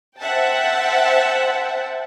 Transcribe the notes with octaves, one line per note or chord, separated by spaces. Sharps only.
C5 E5 F#5 G5 A5